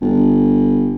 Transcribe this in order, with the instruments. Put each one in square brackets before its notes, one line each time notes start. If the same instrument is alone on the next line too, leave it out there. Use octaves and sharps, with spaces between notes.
[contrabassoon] G1